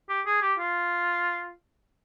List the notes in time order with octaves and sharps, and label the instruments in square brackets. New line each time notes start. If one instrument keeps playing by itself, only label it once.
[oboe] G4
G#4
G4
F4